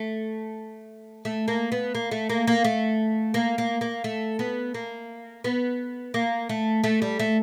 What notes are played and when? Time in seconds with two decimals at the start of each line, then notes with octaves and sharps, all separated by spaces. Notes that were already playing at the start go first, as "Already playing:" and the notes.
Already playing: A3
1.25 A3
1.48 A#3
1.72 B3
1.95 A#3
2.11 A3
2.29 A#3
2.47 A#3
2.64 A3
3.34 A#3
3.58 A#3
3.81 A#3
4.04 A3
4.39 B3
4.74 A#3
5.44 B3
6.14 A#3
6.49 A3
6.84 A3
7.02 G3
7.19 A3